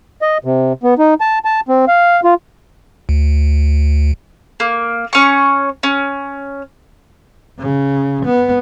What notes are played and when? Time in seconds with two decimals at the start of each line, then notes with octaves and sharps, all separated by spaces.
0.22 D#5
0.44 C3
0.83 B3
0.99 D#4
1.21 A5
1.45 A5
1.69 C4
1.88 F5
2.24 F4
3.09 D2
4.60 A#3
5.13 C#4 C#6
5.83 C#4
7.59 C#3
8.25 B3